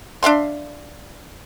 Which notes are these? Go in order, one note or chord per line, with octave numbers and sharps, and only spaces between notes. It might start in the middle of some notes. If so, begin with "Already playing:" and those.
D4 E5 F5 C6